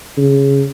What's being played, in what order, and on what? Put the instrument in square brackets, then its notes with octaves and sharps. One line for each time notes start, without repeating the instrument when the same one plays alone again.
[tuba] C#3